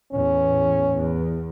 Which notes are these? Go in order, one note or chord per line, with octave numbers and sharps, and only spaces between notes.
E2 A2 C#4
E2